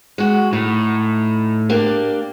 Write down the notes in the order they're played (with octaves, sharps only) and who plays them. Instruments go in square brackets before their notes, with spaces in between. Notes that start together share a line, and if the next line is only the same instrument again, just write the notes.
[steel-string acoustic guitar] G#3 F#4
[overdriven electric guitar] A2 [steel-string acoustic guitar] D#4
[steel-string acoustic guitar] A#3 D4 G4